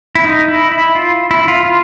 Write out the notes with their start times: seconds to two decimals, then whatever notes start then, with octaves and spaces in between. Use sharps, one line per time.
0.15 E4
0.24 D#4
0.48 E4
0.72 E4
0.95 F4
1.31 E4
1.48 F4
1.66 F4